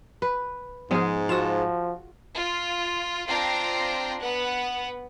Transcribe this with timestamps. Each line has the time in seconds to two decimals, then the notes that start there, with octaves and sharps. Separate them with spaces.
0.22 B4
0.91 G#2 F3 G#3 B3 G#4
1.29 F3 F4 F#4 D#6 E7
2.35 F4
3.28 C4 D4 F4 G5 A#5 C7
4.21 B3 B4 F#5